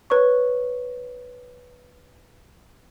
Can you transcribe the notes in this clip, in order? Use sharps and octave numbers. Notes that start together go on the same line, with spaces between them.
B4 C#5 C#6